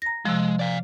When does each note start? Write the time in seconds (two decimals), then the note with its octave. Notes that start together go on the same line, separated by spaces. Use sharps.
0.02 A#5 A#6
0.25 C3 F3 G#3
0.59 D5 F5